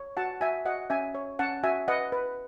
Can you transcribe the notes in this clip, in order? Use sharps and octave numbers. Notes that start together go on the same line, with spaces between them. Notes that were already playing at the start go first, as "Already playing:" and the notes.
Already playing: C#5
F#4 F#5 A5
F#4 E5 G#5
F#4 D#5 F#5
C#4 E5 G#5
C#5
C#4 F#5 A5
F#4 E5 G#5
B4 D#5 F#5
B4